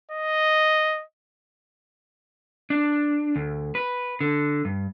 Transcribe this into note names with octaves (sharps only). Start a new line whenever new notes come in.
D#5
D4
D2
B4
D3
G2